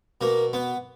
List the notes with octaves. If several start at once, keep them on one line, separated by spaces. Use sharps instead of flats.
B2 A#3
B3